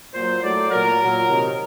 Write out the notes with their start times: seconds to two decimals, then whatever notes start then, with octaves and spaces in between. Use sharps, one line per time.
0.14 A#2 F#3 C5
0.43 A2 F#3 D5
0.71 A#2 F#3 A#4
1.00 A#2 F#3
1.28 C3 D#3 F#3